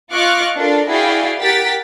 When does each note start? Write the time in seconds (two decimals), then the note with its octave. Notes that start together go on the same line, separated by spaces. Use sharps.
0.12 F4 D#5 C#6 D6 F6 F#6
0.57 D4 F4 A4 A#4 D5
0.88 E4 F#4 G#4 D5 F5 G5
1.39 G4 A#4 F#5 A6 B6 D7